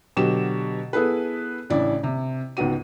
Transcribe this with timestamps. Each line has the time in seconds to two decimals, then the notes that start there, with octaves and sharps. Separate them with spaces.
0.17 B2 D3 F#3 G4 E7
0.93 B3 E4 G#4 A4 B4
1.70 A1 C#3 D4 E4 D5
2.03 C3
2.57 C#2 G#2 B3 F#4 D#7